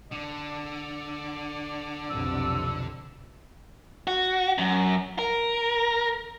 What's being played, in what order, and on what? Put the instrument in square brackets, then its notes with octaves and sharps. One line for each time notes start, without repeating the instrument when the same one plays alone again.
[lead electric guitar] D3 [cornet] D5
[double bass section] B1 F2 C3 [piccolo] E6
[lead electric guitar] F#4
F#2
A#4